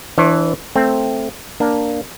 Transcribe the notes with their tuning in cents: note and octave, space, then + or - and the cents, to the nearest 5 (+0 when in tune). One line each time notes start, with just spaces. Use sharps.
E3 +0 D4 +0 C5 +45
A3 +0 C4 +0
A#3 +5 D4 +0